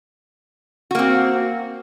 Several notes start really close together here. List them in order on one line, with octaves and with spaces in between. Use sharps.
F#4 A#3 C4